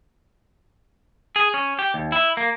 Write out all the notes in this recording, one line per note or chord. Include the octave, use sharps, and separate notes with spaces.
G#4
C#4
G4
D#2
E4
A#3